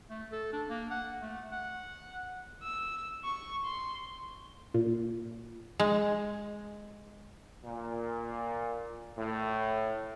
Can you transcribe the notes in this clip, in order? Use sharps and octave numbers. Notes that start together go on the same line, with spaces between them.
A3
A4
D4
A#3
F#5
A3
F#5
E6
C#6
C6
A#2
G#3
A#2
A2